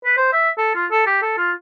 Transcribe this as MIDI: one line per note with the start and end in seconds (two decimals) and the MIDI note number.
0.05 0.17 71
0.17 0.30 72
0.33 0.50 76
0.58 0.71 69
0.75 0.85 65
0.91 1.03 69
1.07 1.19 67
1.22 1.34 69
1.38 1.52 65